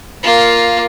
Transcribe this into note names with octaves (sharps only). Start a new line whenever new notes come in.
A#3 F4